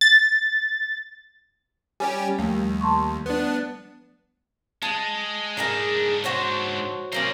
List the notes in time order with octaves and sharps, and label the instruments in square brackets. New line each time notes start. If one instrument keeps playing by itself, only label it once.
[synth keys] A6
[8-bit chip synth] G3 C#4 G4 [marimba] G#5
[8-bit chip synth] D#2 [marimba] F3 G3 A3
[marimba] A5 C6 C#6
[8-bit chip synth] B3 D4
[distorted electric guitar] G#3 [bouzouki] A5
[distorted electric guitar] G#2 D4 [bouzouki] D#4 G#4 A#4
[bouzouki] F#4 C5 C#5
[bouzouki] F#3 A#3 C#4 [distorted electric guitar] C5 D5